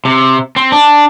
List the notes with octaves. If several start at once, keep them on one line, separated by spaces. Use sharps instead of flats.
C3
C4
D4